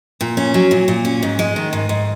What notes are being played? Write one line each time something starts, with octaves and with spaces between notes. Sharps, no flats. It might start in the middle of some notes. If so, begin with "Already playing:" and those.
A#2
C#4
F#3
A#2
A#2
C#4
G#2
G#3
D#3
G#2
G#2